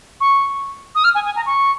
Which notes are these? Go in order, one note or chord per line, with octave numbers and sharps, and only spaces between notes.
C#6
D#6
F6
G#5
G#5
A#5
C#6